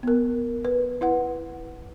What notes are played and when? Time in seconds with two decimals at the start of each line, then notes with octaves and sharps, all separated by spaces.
0.03 B3 A#4
0.65 B4
1.01 E4 B4 F#5